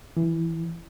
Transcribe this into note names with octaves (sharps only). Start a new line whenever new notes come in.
E3